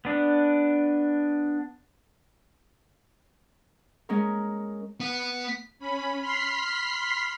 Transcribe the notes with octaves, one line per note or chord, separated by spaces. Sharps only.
B3 D4
G#3 C#4 A#4
B3
C#4 B5
B5 C6 F6 B6 C7